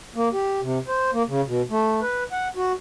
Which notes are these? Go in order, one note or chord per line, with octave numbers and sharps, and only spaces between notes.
A#3
G4
C3
C5
A#3
C#3
B2
A3
B4
F#5
F#4